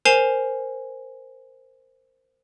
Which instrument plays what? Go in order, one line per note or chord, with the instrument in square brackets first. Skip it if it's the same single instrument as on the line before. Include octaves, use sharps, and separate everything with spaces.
[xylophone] A#4 C5 G#5 C7 E7 F7